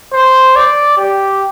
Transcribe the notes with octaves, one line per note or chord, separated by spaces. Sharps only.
C5
D5
G4